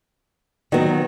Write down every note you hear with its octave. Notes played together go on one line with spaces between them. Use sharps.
D#3 F#3 B3